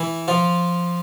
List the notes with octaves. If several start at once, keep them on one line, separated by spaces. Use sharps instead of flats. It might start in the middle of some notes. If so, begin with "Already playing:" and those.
Already playing: E3 E4
F3 F4